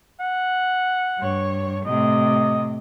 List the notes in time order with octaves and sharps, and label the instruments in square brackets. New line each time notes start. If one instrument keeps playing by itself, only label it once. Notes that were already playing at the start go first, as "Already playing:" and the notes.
[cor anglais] F#5
[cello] G2 C#5
[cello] A2 C3 [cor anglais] D#5